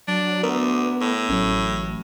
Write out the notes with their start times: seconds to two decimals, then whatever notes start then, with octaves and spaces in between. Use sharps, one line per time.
0.08 F#3 D4
0.43 D2 B3 A#4
1.01 A2
1.29 A1 F#3 C#4